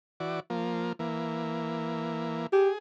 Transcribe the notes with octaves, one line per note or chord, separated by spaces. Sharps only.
E3 F#4 D5
F3 A#3
E3 A#3
G4 G#4